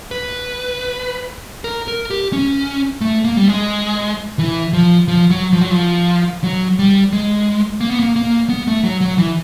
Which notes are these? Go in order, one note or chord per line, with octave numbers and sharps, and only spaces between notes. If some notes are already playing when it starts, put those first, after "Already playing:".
B4
A#4
A#4
G4
C#4
A3
A#3
G3
G#3
E3
F3
F3
F#3
F3
F#3
F3
F#3
G3
G#3
A#3
B3
A#3
A#3
B3
A3
F#3
F#3
E3